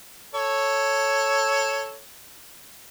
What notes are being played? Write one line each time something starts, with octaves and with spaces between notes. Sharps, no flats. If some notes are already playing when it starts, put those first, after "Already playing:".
A4 C#5